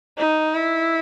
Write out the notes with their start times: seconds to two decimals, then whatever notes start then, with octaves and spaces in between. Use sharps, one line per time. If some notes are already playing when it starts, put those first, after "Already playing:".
0.18 D#4
0.55 E4